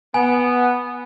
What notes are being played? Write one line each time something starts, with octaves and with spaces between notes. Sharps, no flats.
B3 G#5